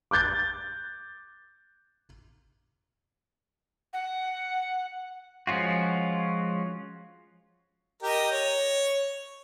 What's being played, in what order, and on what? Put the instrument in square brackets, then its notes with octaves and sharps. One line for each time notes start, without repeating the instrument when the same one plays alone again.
[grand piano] D6 F#6 G6 A6
[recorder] F#5
[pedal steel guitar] F3 G#3 C#4 F4 F#4
[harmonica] G4 A#4 D#5
C#5